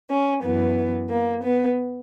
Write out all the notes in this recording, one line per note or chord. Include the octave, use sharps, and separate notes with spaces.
C#4
F#2 E3 B3
A#3
B3